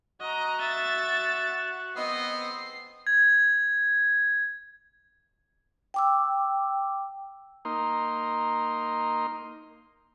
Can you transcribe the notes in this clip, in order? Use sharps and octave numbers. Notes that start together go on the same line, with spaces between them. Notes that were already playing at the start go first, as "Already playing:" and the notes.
F#4 D#5 A#5
E5 A6
B3 C4 D#5 C7
G#6
G5 D6 E6
A#3 D#4 C6